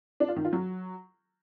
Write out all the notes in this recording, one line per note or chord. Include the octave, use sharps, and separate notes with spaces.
D4
F4
D#3
F4
F#3